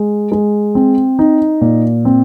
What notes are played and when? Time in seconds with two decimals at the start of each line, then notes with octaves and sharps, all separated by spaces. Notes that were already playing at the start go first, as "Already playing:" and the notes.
Already playing: G#3
0.32 G#3
0.75 C4
1.19 D#4
1.61 A#2
2.05 C4